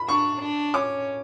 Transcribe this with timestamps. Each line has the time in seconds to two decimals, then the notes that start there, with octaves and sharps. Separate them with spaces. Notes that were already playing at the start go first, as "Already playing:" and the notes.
Already playing: B5
0.08 D4 C#6
0.41 D4
0.74 C#4 D6